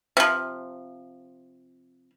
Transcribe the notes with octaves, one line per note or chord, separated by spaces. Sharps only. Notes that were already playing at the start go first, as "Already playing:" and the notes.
C3 F3